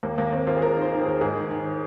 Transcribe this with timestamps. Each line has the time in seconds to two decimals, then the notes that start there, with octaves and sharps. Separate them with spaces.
0.03 D#2 A#3
0.18 D#2 A#3
0.32 D#2 C4
0.47 D#2 F4
0.57 G#4
0.62 D#2 A#4
0.77 D#3 C5
0.91 D#3
1.01 G#4
1.07 D#2
1.21 G#2 G#4
1.36 D#3
1.51 D#3